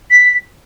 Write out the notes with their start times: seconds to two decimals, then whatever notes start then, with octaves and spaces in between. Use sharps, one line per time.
0.10 B6